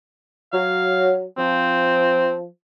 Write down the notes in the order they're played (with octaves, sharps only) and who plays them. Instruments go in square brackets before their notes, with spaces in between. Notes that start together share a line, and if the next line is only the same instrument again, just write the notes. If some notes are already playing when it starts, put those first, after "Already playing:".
[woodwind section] F#3 [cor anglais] F5
[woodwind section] F3 [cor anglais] C4